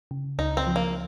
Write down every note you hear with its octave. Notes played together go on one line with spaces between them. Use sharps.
C#3
C#2 D#4
C4
F3
A#3